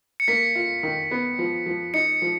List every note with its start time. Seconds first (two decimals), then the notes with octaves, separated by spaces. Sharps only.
0.20 C#7
0.28 A#3 B6
0.55 F4
0.83 D#3
1.11 B3
1.39 F3
1.66 F3
1.94 D#4 C#7
2.22 F3